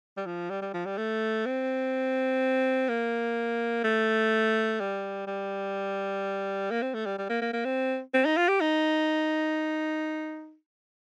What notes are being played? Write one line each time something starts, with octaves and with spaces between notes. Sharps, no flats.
G3
F3
G3
G3
F3
G3
A3
C4
A#3
A3
G3
G3
A#3
C4
A3
G3
G3
A#3
A#3
A#3
C4
C4
D#4
F4
G4
D#4